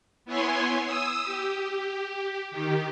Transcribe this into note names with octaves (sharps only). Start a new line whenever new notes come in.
B3 E4 C#5 G#5 C6
D#6 E6
G4
D#3 G4